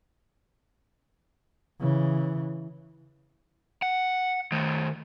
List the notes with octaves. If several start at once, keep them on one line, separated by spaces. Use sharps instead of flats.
C#3 E3
F#5
D#3 A3